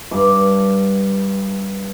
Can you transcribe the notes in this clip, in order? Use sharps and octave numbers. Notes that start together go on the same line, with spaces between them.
G2 D6